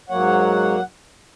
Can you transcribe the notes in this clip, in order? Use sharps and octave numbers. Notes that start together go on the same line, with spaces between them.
G#2 F#3 A#3 C#5 F#5